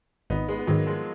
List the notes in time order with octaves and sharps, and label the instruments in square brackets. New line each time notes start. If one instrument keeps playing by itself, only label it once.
[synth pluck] G#1 [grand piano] B3 D#4
[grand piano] G#3 B3
B3
[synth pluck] G#2 D#3 [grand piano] F#3 A#3
[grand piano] F3 G#3